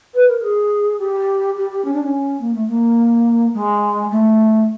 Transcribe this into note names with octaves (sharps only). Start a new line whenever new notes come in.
B4
A#4
G#4
G4
G4
G4
C#4
D4
C#4
A#3
A3
A#3
G#3
A3